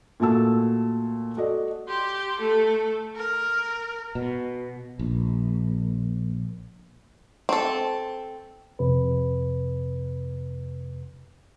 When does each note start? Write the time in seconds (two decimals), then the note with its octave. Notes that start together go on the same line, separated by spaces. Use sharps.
0.20 A#2 A3 F#4 A5 E6
1.37 F#4 A4 D5 D#5
1.88 G4 C6
2.39 A3 A4
3.16 A#4
4.15 B2
4.99 A#1
7.49 C4 A4
8.79 F2 C3 B4